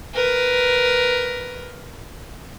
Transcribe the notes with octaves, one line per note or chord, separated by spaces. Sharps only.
A#4 B4